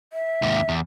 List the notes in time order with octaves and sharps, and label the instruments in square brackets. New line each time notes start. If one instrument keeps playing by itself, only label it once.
[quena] E5
[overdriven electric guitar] D#2 G#2
E2